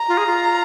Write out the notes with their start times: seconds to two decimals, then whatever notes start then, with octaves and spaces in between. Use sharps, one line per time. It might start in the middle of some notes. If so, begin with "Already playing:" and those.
Already playing: A#5
0.08 F4
0.17 G#4
0.26 F4